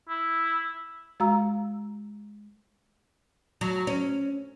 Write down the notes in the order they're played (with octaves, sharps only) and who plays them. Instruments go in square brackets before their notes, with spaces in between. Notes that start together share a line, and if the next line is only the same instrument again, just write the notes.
[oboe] E4
[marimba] G#3 F#4 F5 A#5 E6
[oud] F#3
C#4